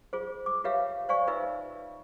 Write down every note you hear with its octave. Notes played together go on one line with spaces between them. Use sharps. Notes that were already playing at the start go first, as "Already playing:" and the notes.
F4 G#4 C5
D6
F4 G4 B4 C#5 E5 F5
C5 D5 F5 G#5 C#6
D#4 F4 B4 E5 E6